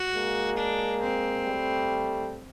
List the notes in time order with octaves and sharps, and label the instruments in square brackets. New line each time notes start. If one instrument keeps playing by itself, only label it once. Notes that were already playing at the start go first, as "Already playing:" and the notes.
Already playing: [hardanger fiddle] F#4
[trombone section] G#3 A#3
[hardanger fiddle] D4
C4
[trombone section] G3 A3